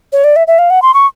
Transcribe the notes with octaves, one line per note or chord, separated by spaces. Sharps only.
C#5
D5
E5
E5
F5
F#5
C6
C#6